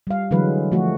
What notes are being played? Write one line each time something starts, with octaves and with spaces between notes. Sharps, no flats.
G3 F5
D3 E3 F#3 G#3 B4
F3 A3 F#4